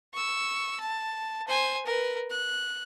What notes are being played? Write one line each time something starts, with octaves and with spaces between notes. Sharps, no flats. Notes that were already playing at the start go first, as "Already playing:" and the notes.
C#6 E6
A5
C5 G#5
A#4 B4
F#6